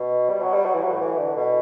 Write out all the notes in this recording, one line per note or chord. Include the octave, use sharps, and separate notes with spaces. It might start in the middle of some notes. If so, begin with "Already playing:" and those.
Already playing: B2
G3
F#3
G3
F#3
E3
F#3
A2
E3
D3
B2